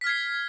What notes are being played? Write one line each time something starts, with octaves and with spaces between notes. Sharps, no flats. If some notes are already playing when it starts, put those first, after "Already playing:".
F6 G#6 B6 C7